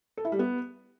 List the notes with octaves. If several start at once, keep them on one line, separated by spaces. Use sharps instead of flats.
A4
E4
G3
B3